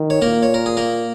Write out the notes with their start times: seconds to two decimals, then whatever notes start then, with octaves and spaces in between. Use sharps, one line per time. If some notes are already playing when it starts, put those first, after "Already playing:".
Already playing: D#3
0.10 C#5
0.22 A#2 A#3 A#4
0.43 C#5
0.54 A#4
0.66 G#4
0.77 A#3 A#4